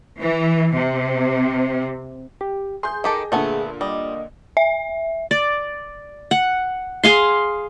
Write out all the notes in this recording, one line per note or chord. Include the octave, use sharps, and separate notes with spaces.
E3
C3
G4
G#4 C6 G6
D#3 G4 A4 D#5
A#2 D3 A3 B3 G#5
G3 D#5
E5
D5
F#5
G#4 F5 C6